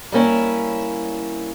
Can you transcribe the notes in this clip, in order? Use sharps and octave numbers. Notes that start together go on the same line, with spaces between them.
G3 A#3 C#4 E4